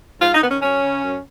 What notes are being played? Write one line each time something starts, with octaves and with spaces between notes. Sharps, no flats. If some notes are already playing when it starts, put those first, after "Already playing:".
G#2 F4
D#4
D#3 B3
C#4
F#2 C#4
C#3
F#2